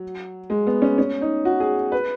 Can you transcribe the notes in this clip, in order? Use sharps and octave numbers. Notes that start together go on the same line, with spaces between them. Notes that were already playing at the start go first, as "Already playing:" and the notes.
Already playing: F#3
G#3
B3
C#4
C#4
D#4
F#4
G#4
B4